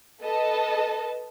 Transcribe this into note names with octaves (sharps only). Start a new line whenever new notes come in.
A4 B4 D#5 A5